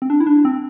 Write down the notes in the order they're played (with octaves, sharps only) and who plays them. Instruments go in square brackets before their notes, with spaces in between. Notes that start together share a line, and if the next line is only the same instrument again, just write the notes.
[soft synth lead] C4
D4
E4
D4
C4